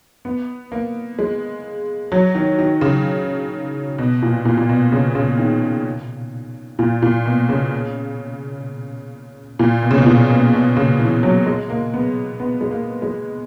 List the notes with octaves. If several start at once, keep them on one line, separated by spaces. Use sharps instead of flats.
B3
A#3
G#3
F#3
D#3
D#3
C#3
B2
A#2
A#2
A#2
B2
C#3
C#3
D#3
A#2
A#2
B2
C#3
A#2
B2
C#3
B2
A#2
B2
B2
C#3
E3
F#3
G#3
A#3
B3
B3
G#3
A#3
G#3